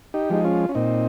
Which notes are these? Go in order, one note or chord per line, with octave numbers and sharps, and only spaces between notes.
D#4 G4
F3 G#3 D#4
C#4 F4
C#4
A#2 C4 D#4